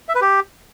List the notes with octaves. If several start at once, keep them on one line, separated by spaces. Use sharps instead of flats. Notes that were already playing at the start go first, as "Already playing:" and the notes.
E5
B4
G4